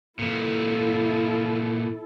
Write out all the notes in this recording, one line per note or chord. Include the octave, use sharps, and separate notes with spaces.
A#2 E3 E4 A4